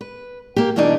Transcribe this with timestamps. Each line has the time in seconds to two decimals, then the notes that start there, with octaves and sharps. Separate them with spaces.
0.01 B4
0.56 A#3 G4
0.76 B2 E3 A#3 D4 D#4 D5